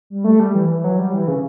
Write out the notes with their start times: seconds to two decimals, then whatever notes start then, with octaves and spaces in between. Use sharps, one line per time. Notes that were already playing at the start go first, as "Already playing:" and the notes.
0.10 G3
0.24 A3
0.40 G3
0.55 E3
0.70 E3
0.84 F#3
0.99 G3
1.13 E3
1.28 C#3